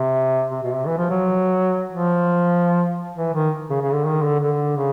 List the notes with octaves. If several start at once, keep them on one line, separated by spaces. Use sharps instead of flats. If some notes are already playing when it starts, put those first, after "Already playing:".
Already playing: C3
C3
B2
C3
E3
F3
F#3
F3
E3
D#3
C#3
C#3
D3
D#3
D3
D3
C#3